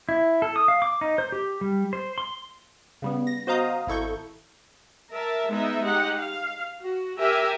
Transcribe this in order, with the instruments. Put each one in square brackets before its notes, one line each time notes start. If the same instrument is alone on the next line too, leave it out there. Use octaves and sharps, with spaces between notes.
[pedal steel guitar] E4
A4
D#6
F5
D6
D#4
C5
G4
G3
C5
C6
[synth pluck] C#3 G3 B3
A#6
F#4 C5 D#5 F5 A#5 D#6
G#1 E4 A4 C#6 G6
[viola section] A#4 E5 A5
G#3 B3 D#4 E5
G#3 D#4 G4 F#5
F5
F#4
G4 A#4 E5 G#5